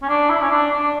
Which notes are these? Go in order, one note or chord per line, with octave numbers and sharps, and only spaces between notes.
C#4
D4
E4
C#4
D4
D4